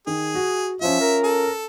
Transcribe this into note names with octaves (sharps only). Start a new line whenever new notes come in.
D#3 G#4
F#4
F3 C#4 F4 E5
A#4
A4